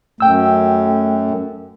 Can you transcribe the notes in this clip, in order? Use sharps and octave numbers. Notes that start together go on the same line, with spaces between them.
F#2 A3 G5 E6